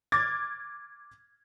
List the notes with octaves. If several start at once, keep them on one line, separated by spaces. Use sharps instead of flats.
D6 F6 G#6 A6